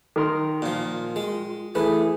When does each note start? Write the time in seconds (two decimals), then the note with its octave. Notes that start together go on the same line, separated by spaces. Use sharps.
0.16 D#3 A#4 C6
0.62 A#2 F3 F4
1.16 G#3
1.75 E3 A3 G#4 B4